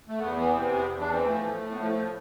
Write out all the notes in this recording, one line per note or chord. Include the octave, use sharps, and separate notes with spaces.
A3
E2 B3
E3 B3
C3 C4
E2 B3
E2
D4
E3 C4
F3 A3
A2
A2
B3
F3 A3
A2